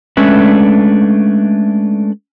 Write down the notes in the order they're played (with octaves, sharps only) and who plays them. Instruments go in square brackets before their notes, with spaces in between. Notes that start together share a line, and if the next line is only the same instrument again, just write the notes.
[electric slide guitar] G#3 A3 C#4 D4 B4 E5